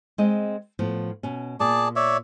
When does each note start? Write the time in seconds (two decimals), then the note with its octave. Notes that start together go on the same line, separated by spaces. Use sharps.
0.18 G#3 C4 D#5
0.79 A2 F3 B3
1.23 B2 C#4
1.60 A#2 G#4 D5 A5
1.96 C#5 D5 E5